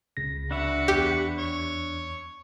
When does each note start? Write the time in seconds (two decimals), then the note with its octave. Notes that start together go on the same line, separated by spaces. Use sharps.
0.17 C#2 C#3 A#6
0.51 D4 F#4 B4 E5 F#5
0.88 E2 G4
1.38 C#5